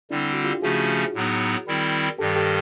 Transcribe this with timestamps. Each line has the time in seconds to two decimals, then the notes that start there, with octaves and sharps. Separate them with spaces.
0.11 D3 G3 C4 D4 E4
0.33 F#4
0.44 F4 G4
0.62 C#3 F3 A3 C#4 F#4 G#4
1.14 A2 F#3 B3 D#4
1.67 D#3 G3 C4 E4
2.19 G2 D#3 G3 G4 A4
2.36 G4 A4